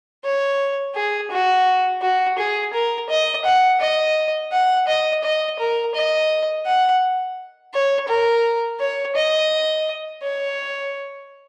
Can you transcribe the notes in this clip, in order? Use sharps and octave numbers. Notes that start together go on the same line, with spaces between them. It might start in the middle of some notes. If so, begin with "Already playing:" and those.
C#5
G#4
F#4
F#4
G#4
A#4
D#5
F#5
D#5
F#5
D#5
D#5
A#4
D#5
F#5
C#5
A#4
C#5
D#5
C#5